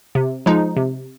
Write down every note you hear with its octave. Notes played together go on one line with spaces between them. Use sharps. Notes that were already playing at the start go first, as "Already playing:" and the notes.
C3
F3 G#3 D#4
C3